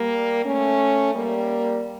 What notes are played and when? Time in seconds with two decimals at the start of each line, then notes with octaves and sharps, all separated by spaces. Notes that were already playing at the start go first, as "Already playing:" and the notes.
Already playing: G3 A#3
0.46 A3 C#4
1.14 G3 A#3